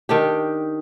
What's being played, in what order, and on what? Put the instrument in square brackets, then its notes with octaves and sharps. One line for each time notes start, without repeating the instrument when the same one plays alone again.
[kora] D#3 D4 G4